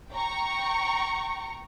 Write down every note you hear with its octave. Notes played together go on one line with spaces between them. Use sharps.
G5 A#5 C#6